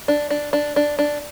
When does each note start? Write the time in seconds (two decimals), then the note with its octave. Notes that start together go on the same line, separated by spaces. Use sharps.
0.08 D4
0.30 D4
0.53 D4
0.76 D4
0.99 D4